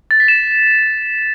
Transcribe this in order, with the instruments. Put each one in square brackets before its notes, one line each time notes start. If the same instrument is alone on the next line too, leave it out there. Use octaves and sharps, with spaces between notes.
[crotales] A6
B6
E7